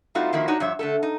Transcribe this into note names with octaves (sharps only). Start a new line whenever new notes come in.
G3 A3 C4 D#4 F4 F#4
D#3 F3 A#3 E4 F#4
D4 D#4 F#4 C#5
G2 F3 C#5 E5
D3 A3 A4
D#4